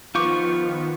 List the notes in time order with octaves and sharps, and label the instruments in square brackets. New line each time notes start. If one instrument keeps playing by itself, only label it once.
[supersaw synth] D#3 F3 B3 [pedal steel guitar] F4 C#6 [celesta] D6 G6